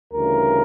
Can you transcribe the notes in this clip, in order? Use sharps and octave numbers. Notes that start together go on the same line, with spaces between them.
D2 C#3 E3 G3 A#4